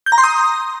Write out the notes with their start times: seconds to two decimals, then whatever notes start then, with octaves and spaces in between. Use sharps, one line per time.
0.06 G6
0.12 A#5
0.18 C6
0.24 D#6